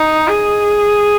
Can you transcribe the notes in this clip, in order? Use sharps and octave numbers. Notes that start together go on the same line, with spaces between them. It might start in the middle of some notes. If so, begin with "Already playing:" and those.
Already playing: D#4
G#4